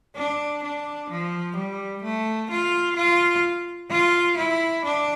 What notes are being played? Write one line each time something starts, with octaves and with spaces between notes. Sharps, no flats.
D4
D4
F3
G3
A3
F4
F4
F4
E4
D4